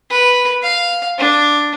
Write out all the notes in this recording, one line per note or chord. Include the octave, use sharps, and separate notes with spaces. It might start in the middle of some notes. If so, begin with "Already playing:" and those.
B4
F5
D4